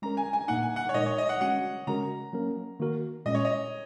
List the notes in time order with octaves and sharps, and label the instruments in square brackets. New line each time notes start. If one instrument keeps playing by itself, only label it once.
[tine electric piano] G#3 C#4 A#4 [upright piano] A#5
[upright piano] G#5
G#5
[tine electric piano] A#2 A#3 D#4 [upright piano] F#5
[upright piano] G#5
F#5
C#5
[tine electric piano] A#2 G#3 D#4 A#4 [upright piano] D#5
[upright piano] C#5
D#5
F#5
[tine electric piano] G#3 C#4 F#4 [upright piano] F#5
[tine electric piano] C#3 G#3 C#4 F#4 A#4 [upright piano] A#5
[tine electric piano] F#3 A#3 C#4 A#4
D#3 A#3 F#4 A#4
[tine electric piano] A#2 G#3 C#4 [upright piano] D#5
[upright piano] C#5
D#5